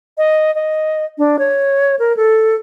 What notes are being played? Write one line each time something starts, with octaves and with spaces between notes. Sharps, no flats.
D#5
D#5
D4
C#5
A#4
A4